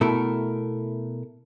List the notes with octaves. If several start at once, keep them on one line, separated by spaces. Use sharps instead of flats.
B2 A3 E4 A4 A#4